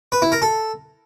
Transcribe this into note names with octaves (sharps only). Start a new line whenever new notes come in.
B4
E4
A#4
A4